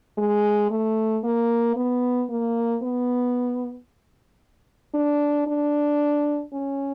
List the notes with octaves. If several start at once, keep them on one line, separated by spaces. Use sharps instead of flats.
G#3
A3
A#3
B3
A#3
B3
D4
D4
C#4